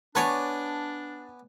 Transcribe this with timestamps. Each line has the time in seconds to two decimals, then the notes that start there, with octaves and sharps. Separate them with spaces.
0.15 B3 D4 B4 C#5 D5 G#5 A5 D6